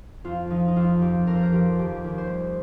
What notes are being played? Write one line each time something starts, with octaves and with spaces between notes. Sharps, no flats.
F2 F4
F3 D#4
D#4
F2 F4
F3 G4
F2 A#4
C5
A#4
F3 G4
D#2 G4
D#2
C5
G3